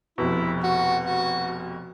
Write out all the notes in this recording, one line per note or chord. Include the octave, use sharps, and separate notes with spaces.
F1 F2 B2 E4
F#4
F#4